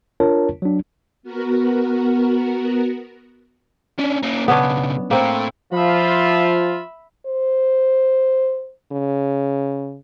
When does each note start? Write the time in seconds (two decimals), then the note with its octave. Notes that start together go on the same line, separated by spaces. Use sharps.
0.20 D4 F4 A#4 C#5 A5
0.62 F#3 D4
1.23 B3 F#4 A#4
3.99 C#4 D4
4.22 A#3 C#4
4.48 B1 C#3 B3 C#4 D4
5.11 A2 A3 A#3 C4
5.73 F3 F4 E5 B5
7.26 C5
8.92 C#3